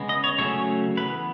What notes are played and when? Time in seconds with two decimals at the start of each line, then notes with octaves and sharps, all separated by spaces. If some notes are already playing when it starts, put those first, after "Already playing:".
Already playing: C#3 G#3 B3
0.09 D#5
0.24 C#5
0.38 C#3 F#3 A3 C#4 C#5
0.97 E3 B3 B4